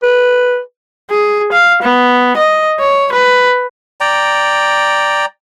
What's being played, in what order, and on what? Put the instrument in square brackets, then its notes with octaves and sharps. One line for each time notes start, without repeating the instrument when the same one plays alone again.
[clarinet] B4
[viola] G#4
F5
B3
D#5
C#5
B4
[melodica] D5 G5 A#5